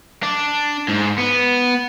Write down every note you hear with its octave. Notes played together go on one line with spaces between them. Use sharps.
D4
G#2
B3